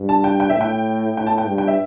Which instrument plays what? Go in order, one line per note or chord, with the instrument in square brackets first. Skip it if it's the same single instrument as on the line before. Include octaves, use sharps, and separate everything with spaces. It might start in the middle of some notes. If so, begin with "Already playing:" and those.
Already playing: [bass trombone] G2
[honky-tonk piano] A5
G5
G5
E5
[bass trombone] A2 [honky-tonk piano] G5
[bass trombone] A2 [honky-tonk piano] G5
[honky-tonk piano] A5
G5
[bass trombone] G2
[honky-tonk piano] G5
E5